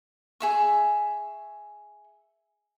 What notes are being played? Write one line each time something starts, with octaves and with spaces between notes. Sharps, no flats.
G#4 E5 C#6